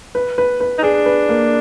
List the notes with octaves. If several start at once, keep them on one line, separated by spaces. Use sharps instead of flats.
B4
B4
B4
D#4
D4 G#4
B4
A#3